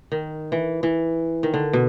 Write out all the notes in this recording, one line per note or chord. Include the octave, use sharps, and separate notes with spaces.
D#3
E3
E3
D#3
D3
B2